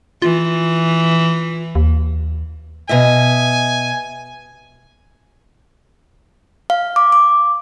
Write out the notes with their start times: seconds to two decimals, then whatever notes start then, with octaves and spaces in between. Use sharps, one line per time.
0.22 E3 F4
1.75 D#2
2.89 B2 D#5 E5 G#5
6.70 F5
6.96 D6
7.12 D6